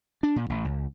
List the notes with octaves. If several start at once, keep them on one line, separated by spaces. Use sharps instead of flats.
D4
A#2
A1
C#2